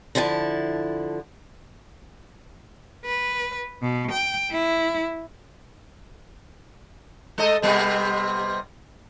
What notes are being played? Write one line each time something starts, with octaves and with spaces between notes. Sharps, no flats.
D3 F3 E4 G#5 A5
B4
B2
G5
E4
G#3 A4 D#5
C3 G3 B3